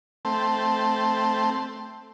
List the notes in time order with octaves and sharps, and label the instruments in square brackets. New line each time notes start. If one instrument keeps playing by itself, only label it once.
[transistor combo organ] A3 C4